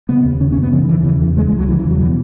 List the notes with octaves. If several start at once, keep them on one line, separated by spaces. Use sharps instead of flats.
C#3 B3
D#2
C#3 C#4
C#4
F#2
B3
C#3 E3
D#3
D#2 E3
C#3 E3
E2 E3
C#3 G#3
G#3
C#2
F#3
C#3 E3
E3
E2
F#3
B2 E3